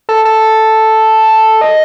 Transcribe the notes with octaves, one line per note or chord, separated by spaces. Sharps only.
A4
A4
D#5